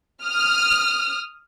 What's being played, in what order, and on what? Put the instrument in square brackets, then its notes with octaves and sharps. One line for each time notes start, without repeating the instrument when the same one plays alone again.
[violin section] D#6 F6